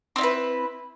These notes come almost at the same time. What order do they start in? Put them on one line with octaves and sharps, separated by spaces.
C4 D#4 E4 B4